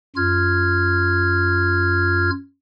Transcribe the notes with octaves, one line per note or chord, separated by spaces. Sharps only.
F#2 F4 F6 G#6